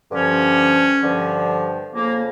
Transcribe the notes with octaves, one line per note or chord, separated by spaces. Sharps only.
G2 D3 F3 C#4
G2 D3 F3
F2 C#3 F3 A#3